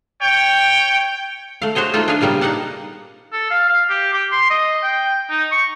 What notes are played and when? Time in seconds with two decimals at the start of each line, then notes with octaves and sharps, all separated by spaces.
0.21 C#5 G5
1.62 A3 F5
1.75 F#4 G#4 C5 C#5 D#5
1.94 A3 A#3 D#4 F4
2.08 D4 G#4 B4 F5 G#5
2.21 A#2 C#3 G3 A#3 B3
2.41 A#3 D#4 F5 F#5 A5
3.32 A4
3.51 F5
3.69 F5
3.90 G4
4.13 G4
4.32 C6
4.50 D#5
4.83 G5
5.30 D#4
5.51 C#6